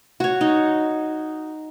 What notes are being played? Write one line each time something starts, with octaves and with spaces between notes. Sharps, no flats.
F#4 C#5
D#4